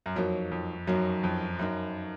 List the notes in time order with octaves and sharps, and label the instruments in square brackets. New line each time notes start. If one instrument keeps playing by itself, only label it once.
[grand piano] F#2
[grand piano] F2 [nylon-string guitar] F#3 A#3 D#4
[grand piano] F2
[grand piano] F#2 [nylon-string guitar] F#3 A#3 D#4
[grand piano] F2
[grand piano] F#2 [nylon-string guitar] F#3 A#3 D#4